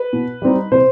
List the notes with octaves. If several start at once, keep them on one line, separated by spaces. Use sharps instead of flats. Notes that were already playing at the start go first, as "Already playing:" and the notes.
Already playing: B4
B2
G3 C4 D#4
C3 C5